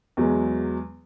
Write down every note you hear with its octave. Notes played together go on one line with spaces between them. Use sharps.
E2 F#3 G#3